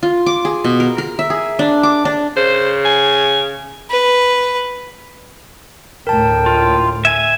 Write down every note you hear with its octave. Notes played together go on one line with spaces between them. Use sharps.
F4
D6
G#4
B2
A#4
A#4
E5
G#4
D4
D6
D4
C#3 C5
G#5
B4
D2 A2 A#4 G5 A5
F4
E5 G#5 G#6